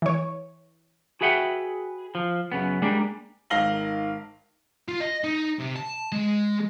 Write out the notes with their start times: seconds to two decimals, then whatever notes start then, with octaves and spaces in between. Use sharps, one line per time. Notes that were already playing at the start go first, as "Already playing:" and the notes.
0.02 E3 C#5
1.21 F#4 G#4 B4 E5 F#5 G5
2.15 F3
2.52 F#2 C#3 B3
2.82 G3 G#3 A#3 D4
3.50 G#1 D#3 F5 A#6 F#7 G7
4.88 F4
5.01 D#5
5.24 D#4
5.59 C3
5.76 A5
6.12 G#3